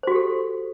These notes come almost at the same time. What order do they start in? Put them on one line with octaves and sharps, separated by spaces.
C5 F#4 G4 A4